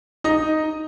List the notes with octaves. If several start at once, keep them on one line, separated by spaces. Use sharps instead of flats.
D#4 D#5